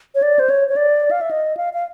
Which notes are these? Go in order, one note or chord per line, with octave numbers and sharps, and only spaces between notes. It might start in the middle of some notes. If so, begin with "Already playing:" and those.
C#5
D5
C5
C#5
C#5
D5
F5
E5
D#5
F5
F5